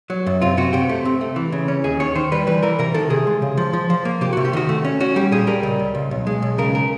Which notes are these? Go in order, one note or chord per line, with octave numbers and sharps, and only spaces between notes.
F#3
F#2
C3 F4
C3 F#4
C3 G4
A3
C3
A3
E3
C#3
C#4
D#2 G#4
D#3 C#5
D#3 C5
G3 B4
E3 B4
E3 A#4
C3 A#4
D#3 A4
C3 G#4
G#3
C#3
F3
F3
F3
A#3
C3 G4
C3 F#4
G4
D#3 F#4
A3
C#4
C#4 F#4
G3 G4
A#2 G#4
G3 A#4
C#2
C#2
C#2
B1
G#3
B1
C#3 A#4
A#4